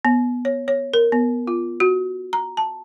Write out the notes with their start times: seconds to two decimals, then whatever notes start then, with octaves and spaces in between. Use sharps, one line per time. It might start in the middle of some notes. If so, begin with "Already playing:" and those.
0.05 B3
0.45 C#5
0.68 C#5
0.94 A#4
1.12 B3
1.47 F4
1.80 F#4
2.33 A#5
2.57 A5